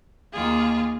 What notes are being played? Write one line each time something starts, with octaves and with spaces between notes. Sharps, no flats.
D#2 D#3 A#3 F4 G#4